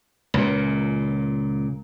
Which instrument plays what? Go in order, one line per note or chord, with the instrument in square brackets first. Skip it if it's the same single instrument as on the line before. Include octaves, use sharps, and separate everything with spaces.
[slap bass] C#2 A#2